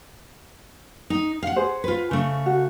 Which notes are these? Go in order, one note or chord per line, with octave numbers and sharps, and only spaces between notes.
D#4
F5 F#5
G#4 C5
F4 B4
C#3 A3
F#4